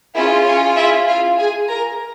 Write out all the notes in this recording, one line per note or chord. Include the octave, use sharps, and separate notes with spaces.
C#4 E4 F4 G#4 E5
C#4 C#5
E4 E5
F4 F5
G#4 G#5
A#4 A#5